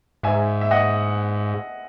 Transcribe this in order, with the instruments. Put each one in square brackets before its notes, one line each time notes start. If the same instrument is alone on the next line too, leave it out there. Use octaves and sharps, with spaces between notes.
[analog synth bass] G#2 [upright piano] E5 G#5
[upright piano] E5
D#5 F#5